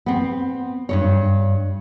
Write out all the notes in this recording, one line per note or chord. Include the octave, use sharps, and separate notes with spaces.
B3 C4
G2 C3 C#5